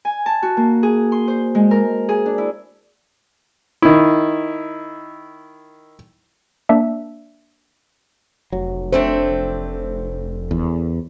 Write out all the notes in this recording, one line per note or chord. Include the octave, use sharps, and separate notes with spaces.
G#5
A5
F#4
A#3
G#4
C6
C5
G#3
A#4
G#4
D4
E4
D#3 E4
A#3 D4 E5
F1 F#3
A3 C4 D4 C5
E2